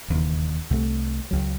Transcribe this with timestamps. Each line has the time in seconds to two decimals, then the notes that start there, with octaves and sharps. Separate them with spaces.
0.08 E1 D#2 C#3 E3
0.70 C2 C3 D#3 A3
1.31 C#2 C#3 F#3